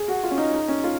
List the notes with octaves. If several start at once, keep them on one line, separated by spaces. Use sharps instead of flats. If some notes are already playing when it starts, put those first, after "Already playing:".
Already playing: G#4
F#4
F4
C#4
D#4
D#4
C#4
F4